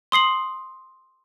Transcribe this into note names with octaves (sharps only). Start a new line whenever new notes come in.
C6 D#6 C7 F#7